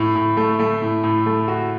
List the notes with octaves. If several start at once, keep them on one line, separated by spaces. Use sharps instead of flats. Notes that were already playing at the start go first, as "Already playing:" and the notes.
Already playing: A2
A2
A3
A3
A2
A2
A3
F#4